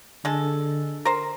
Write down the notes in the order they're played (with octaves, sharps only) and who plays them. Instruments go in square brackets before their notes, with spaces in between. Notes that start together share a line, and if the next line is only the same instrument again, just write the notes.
[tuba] D3 [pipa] G#3 A4
[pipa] A#4 C5